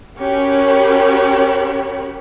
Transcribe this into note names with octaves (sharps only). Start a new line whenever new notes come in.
C#4 F#4 G4 A#4 C#5 B5